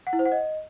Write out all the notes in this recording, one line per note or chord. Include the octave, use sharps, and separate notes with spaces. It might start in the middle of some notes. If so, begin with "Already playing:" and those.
F#5
E4
C5
F#5
D#5